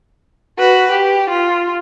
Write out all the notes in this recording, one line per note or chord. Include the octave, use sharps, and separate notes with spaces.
F#4 B4
G4
F4